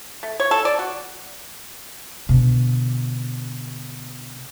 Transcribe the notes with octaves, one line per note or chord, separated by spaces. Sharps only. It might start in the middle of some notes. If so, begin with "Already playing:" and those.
A3
C#5
A4
D5
F#4
B2 D3